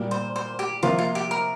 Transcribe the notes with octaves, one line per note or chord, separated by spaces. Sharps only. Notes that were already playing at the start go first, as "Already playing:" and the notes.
Already playing: A#2 G3 A#3
C5
C5
G4
C3 F3 A#3 F4
F4
G4
A#4